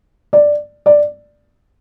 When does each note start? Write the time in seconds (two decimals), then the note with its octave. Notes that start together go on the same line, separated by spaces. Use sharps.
0.33 D5
0.86 D5